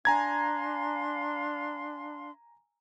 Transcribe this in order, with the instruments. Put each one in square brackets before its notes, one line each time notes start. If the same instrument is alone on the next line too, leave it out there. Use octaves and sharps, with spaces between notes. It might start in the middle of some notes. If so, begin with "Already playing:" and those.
[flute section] D4 F5 C6 [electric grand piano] G#5 A#5 G#6